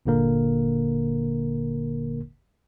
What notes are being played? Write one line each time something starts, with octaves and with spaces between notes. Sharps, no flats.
G1 A#2 D3 A#3 A#4